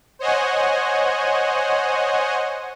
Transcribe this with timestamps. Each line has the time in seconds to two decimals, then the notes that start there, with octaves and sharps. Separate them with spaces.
0.19 C5 C#5 D#5 F#5 G#5